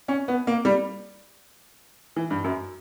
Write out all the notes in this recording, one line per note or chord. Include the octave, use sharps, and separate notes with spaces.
C#4
B3
A#3
G3
E3
G2
F#2